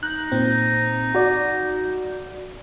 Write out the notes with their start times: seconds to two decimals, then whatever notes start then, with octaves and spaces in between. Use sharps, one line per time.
0.03 D#4 F#6
0.32 A#2 C4
1.15 F#4 D5